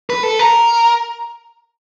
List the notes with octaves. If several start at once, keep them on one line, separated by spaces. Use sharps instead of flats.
B4
A4
A#4